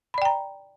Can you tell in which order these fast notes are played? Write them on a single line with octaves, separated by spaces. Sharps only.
B5 D5 G5 A#5